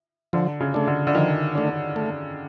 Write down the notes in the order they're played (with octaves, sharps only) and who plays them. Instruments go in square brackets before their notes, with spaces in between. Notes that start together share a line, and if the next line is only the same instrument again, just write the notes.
[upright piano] D3 [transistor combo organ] F3
[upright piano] C#3
[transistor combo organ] A3 D4
[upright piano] D3
D3
[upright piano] D#3 [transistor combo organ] F3
[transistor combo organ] A3 D4
A3